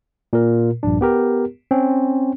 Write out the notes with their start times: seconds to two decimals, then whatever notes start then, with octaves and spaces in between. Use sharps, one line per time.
0.33 A#2 A#4
0.83 A#1 G2 D4
1.01 B3 G4 A#4
1.71 C4 C#4